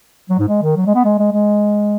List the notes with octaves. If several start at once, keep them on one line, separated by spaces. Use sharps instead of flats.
F#3
G#2
G#3
D#3
F#3
G#3
B3
G#3
G#3
G#3